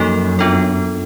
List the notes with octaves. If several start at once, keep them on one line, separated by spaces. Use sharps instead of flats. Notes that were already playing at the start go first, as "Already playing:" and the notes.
Already playing: F#2 F3 A#3 D#4 F#4 A4
B3 D4 F4 A4